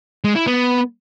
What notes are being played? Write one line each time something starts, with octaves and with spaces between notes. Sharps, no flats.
G#3
E4
B3